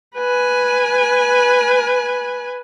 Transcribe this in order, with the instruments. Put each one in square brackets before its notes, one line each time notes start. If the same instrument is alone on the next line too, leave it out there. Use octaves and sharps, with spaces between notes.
[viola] B4 G#5